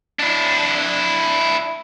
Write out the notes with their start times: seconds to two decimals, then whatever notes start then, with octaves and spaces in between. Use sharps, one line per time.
0.20 D4 E4